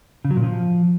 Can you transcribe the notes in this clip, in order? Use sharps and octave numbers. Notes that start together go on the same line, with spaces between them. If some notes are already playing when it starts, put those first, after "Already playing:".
C#3
F#3
A#2
F3